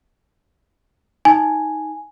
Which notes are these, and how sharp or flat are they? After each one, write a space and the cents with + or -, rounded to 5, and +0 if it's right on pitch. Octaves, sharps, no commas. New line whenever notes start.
D#4 +15 G#5 +0